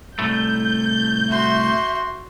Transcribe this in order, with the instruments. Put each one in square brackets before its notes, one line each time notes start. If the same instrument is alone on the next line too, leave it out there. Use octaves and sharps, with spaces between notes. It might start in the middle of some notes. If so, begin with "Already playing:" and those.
[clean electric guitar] C2 A2 A3 [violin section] G6
[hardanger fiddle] F#4 C6 [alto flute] E5